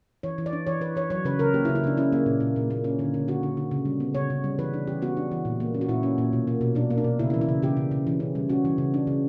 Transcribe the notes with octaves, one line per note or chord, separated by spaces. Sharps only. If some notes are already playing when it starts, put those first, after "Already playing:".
E3 C#5
E3
D5
D4
E3 C#5
E3 B4
E3 C#5
F#3 C#5
C#3 B4
C#3 A#4
A#3 G4
E4
C#3
E4
C#3 D4
C#4 E4
A#3
A#2
A#2
A#2
A#3
C#4
D3
D3
D3 F#4
D3
D3
C#3
G3
B3
C#3 C#5
C#3
G3
E3 B4
D4
E3 G4
B3 F#4
D4
E3
A#2
A#3
C#4
F#4
A#2 E4
C#4
A#2
B2
A#3
B2
B2 D4
A#3
D4
B2
C#3 E4
E4
E3
E4
C#3
C#3 G4
C#3
C#3
E3
C#4
G3
C#4 F#4
E3
C#3
D4
C#3